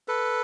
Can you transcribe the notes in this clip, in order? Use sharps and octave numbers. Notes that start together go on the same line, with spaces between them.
A4 B4